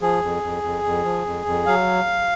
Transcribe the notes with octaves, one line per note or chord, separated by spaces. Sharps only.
F3 G#4
F2
F2
F2
F2
F3
F2
F2
F#3 F5